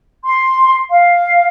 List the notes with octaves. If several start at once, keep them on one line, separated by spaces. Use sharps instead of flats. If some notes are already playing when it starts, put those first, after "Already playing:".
C6
F5